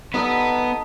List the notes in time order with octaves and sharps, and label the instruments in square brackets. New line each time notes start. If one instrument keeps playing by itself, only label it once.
[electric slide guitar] B3 B4 [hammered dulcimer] D#4 A4 D#5